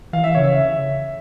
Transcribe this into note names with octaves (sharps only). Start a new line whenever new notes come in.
E3 F5
E5
C#3 C#5
E5
E5